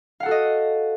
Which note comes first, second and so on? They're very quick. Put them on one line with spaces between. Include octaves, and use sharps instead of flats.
F5 F#5 A4 F#4 D#5